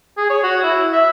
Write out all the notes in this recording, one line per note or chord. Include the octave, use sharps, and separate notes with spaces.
G#4
C#5
F#4
E4
E5